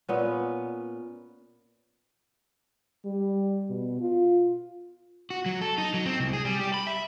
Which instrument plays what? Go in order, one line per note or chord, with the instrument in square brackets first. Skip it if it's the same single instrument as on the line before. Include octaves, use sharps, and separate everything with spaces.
[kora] A#2 B3 C#4
[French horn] G3
B2
F4
[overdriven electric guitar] F#4
F#3
A4
D#4
F#3
C4
C2
G#4
G3
G4
B5
E5